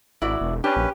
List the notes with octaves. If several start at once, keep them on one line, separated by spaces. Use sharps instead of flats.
G#1 E4 F#4 D5
E1
C#4 D4 G4 B4
A#1